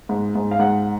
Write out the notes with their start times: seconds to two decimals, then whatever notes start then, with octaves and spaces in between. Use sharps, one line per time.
0.09 G#2
0.35 G#2
0.51 F5
0.59 G#2 F#5